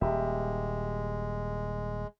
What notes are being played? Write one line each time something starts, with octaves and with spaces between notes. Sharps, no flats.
D#1 G#3 G4 E5